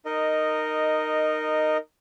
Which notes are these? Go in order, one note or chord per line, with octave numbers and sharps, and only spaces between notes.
D#4 A#4 D#5